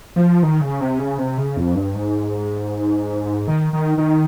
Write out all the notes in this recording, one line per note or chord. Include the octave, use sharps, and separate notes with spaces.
F3
D#3
C#3
C3
C#3
C3
C#3
F2
G2
G#2
D#3
D#3
D#3